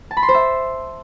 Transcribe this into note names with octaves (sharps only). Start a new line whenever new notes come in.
A5
B5
C6
C5
E5